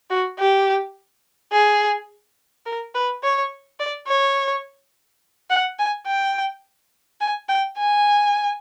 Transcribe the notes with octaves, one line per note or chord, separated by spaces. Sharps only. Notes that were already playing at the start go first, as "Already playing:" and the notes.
F#4
G4
G#4
A#4
B4
C#5
D5
C#5
F#5
G#5
G5
G#5
G5
G#5